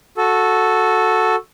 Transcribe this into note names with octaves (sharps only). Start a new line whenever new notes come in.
F#4 A4